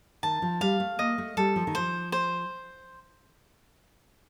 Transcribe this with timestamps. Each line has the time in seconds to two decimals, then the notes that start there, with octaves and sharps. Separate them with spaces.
0.23 D#3 A5
0.42 F3
0.61 G3 F5
0.80 A3
0.99 A#3 D#5
1.18 A3
1.37 G3 A4
1.56 F3
1.67 D#3
1.75 F3 C5
2.12 C5